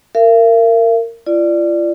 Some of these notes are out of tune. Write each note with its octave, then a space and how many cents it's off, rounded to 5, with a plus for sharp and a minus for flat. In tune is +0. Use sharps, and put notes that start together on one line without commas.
A#4 -20 E5 +45
F4 -40 D5 +5